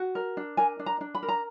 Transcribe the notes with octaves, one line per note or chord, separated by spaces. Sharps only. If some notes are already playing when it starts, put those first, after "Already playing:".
Already playing: F#4
A#4
D4
A#4 G#5
D4
A#5
D4
B5
A#4
A#5